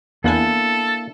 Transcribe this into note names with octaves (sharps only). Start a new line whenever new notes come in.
E2 A#3 B3 D4 E4 A4 F#5 G#5